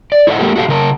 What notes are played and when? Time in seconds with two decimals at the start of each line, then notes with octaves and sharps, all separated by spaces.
0.12 D5
0.27 E4 A4 C5 D#5 F#5
0.39 G#3 A#3 G4 A4
0.56 F#4 G4 A4 D#5 F5
0.69 C#3 A#4 C5 A5